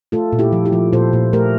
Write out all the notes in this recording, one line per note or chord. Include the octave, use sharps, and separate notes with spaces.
A3 F4 A4
A#2
E4 G4
F3
E4 G4
F3
A#2 A4 C5
A#2
A3 G4 A#4